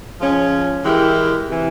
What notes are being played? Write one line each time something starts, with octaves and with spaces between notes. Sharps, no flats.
F3 G#3 C#4 F4
E3 G#3 E4 G4 A#4
C3 E3